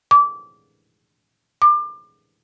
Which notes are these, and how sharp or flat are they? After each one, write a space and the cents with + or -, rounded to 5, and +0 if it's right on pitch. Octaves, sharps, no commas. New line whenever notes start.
D6 -20
D6 +30